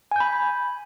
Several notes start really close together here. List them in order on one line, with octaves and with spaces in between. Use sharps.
G#5 G6 B5